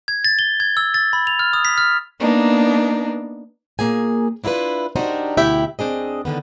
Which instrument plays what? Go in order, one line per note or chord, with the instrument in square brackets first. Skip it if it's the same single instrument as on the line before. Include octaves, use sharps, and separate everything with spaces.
[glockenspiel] G#6
A6
G7
G#6
E6
A6
B5
F7
F6
D#6
B6
F6
[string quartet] A#3 B3 D4 D#4
[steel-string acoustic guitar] A#2 C#3 A#3 G#4 G#5
D4 E4 F4 A#4 B4
D4 D#4 F#4 G4 A#4 C5
D2 B2 E4 G4 E5 G5
C4 D4 G#4 D#5
A2 D3 D#3 B3